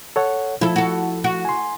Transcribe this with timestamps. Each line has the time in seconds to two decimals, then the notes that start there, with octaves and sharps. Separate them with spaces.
0.16 A4 C#5 F#5
0.61 F3 E4 A4
0.76 F#4 A4
1.24 F#4
1.45 G#5 C6